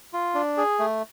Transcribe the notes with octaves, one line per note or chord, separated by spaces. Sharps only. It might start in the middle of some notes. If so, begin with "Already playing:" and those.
F4
D4
G#4
A3